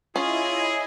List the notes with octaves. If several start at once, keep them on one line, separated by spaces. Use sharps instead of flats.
C#4 E4 F4 G#4 D#5 G#5